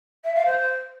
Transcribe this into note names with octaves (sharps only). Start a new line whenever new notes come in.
E5
F5
C5